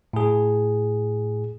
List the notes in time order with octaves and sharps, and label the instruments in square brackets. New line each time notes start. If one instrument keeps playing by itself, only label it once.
[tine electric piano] A2 G#4